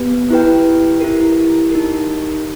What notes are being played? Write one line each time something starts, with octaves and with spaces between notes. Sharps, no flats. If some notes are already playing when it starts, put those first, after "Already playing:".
Already playing: B3 G4 B4
E4 G4 B4 G5
E4 G4 A#4
D#4 G4 A#4